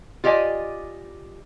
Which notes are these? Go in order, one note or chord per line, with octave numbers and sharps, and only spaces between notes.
F4 G4 D5 D#5 G#5